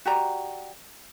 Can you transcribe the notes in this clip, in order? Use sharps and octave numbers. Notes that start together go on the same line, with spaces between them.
F#4 G4 D5 A#5